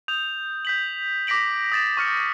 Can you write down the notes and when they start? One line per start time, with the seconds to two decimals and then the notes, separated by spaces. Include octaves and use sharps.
0.08 D#6 G6 F7
0.65 G6 B6 F#7
1.27 D6 A#6 B6 D7 F#7
1.72 D#6 A6 E7
1.97 C#6 F6 C#7